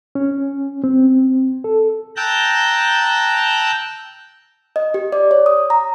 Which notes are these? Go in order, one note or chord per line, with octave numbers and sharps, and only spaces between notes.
C#4
C4
A4
G5 A5 A#5 E6 F#6 G6
D#5
G4
D5
C#5
D#6
A#5